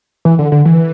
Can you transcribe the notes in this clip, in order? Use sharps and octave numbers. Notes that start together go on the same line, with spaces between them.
E3
D3
D3
E3